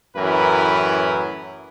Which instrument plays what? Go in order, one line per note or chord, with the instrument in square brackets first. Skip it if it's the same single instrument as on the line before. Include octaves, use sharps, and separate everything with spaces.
[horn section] F#2 A2 E3 A#4 B4